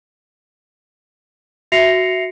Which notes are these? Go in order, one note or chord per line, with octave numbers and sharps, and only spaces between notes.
F#4 E5 A#6 C7 C#7 F7